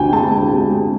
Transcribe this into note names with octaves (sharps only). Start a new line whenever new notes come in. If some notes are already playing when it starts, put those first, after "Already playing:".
Already playing: D2 C3 G5 G#5
G#3 A5
G#3
C3
G#3